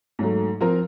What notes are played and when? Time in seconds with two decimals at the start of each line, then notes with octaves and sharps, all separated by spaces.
0.19 G#2 F#3 A3
0.61 F3 C4 A#4